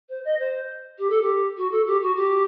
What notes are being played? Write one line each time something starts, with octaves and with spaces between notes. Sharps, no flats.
C5
D#5
C5
G4
A4
G4
F#4
A4
G4
F#4
G4